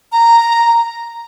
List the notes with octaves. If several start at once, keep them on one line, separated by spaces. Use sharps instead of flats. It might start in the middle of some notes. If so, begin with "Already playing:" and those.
A#5